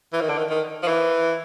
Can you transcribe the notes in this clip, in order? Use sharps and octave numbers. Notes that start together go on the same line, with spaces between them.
E3
D#3
D3
D#3
D#3
F3
E3